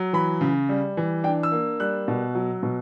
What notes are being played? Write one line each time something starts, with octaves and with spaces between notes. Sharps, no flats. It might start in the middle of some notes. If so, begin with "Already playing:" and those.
Already playing: F#3
E3 B5
C#3
G3
E3
D4 G5
E6
A#3
G3 F#6
B2
F#3
B2